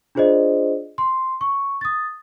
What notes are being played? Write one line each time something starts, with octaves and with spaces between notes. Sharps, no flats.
D4 F4 G#4 C5 D5 D#5
C6
C#6
D#6 A6